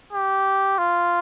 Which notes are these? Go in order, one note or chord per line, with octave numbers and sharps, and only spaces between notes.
G4
F4